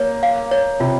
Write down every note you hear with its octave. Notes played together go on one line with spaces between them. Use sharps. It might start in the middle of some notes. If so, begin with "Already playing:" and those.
Already playing: A#3 C#5
F5
C#5
C3 F4